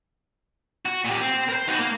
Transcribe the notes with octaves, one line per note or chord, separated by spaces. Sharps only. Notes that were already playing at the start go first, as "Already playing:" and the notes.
F#4
A#2 G4
C4
A#4 C5
D#4 F#4
A#3